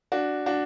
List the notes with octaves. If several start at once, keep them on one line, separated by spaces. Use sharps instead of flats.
D4 F#4
D4 F#4